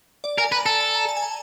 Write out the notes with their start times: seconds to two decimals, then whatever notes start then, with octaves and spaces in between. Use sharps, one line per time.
0.24 D5
0.38 A#4 G#5
0.52 B4 A#5
0.66 A4 A5
0.81 A5
0.95 A#5
1.08 A5
1.17 G#5
1.23 A5